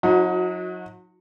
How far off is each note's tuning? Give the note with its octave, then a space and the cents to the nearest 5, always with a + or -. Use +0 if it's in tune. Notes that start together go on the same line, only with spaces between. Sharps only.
F#3 -35 D#4 +30 F#4 -15